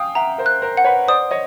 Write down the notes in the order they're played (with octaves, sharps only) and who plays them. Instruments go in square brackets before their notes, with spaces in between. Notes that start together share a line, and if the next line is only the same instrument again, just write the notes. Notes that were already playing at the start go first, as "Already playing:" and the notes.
Already playing: [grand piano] F5 G5 G#5 [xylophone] D#6
[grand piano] E5 F#5 [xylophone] A#5
[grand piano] A#4 C5
[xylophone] F#6
[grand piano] A#4 C5
[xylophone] F#5
[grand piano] B4 C#5
[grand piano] C5 D5 [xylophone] D#6
[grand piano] C#5 D#5